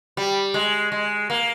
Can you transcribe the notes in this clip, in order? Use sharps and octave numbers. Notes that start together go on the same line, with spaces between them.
G3
G#3
G#3
A#3